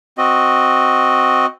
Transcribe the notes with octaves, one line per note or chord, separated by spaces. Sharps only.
C4 F#4 D#5